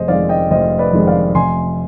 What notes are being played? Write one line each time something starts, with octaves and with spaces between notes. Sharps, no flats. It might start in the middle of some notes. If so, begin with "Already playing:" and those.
Already playing: F1 G#4 C5 D#5
F2 D#3 G#3 D5 F5
D#5 G5
F1 C5 D#5
B4 D5
F2 D#3 G#3
D5 F5
F1 G#5 C6